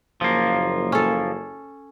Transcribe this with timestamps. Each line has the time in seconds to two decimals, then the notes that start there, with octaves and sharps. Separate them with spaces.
0.21 F#1 F3 A#3
0.92 C#4 A4